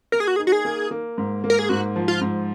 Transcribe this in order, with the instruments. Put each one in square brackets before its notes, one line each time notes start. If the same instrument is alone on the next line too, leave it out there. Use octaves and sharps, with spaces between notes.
[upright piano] A#3 [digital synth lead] A#4
[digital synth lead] G#4
F#4
[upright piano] D#4 [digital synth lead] G#4
[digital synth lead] F#4
G#4
[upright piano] A#3
A#3
G#2
A#3
[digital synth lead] A#4
G#4
[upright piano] G#2 [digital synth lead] F#4
[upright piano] F3
[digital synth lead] F4
[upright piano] G#2